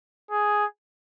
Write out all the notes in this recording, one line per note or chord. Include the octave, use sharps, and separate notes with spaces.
G#4